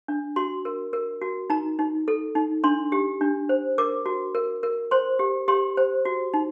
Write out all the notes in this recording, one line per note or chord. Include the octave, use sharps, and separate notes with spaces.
D4
F#4 C6
A#4
A#4
F#4
D#4 A#5
D#4
A4
D#4
D4 C6
G4
D4
C5
A#4 D6
F#4
A#4
A#4
C5 C6
G4
G4 C6
C5
F#4
D#4